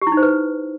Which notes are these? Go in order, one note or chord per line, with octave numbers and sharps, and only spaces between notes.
G4
E4
D#4
C5
B4